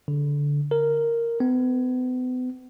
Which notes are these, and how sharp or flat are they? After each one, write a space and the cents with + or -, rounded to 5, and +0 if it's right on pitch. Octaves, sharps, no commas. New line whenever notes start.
D3 -15
A#4 -5
B3 +40